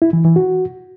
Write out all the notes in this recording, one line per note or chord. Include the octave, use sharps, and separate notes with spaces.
E4
E3
E3
F#4